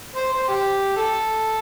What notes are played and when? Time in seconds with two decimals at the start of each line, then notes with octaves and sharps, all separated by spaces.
0.16 C5
0.32 C5
0.48 G4
0.97 A4